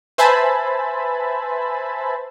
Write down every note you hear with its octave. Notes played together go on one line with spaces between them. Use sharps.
B4 C5 E5 G#5 A5 B5